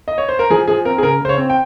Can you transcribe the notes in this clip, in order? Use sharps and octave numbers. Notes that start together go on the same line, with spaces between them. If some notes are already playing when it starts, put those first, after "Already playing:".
D#5
C#5
C5
A#4
F3 G#4
F3 G#4
C4 A#4
G#4
C#3 A#4
C#3 C5
C#5
C4
G5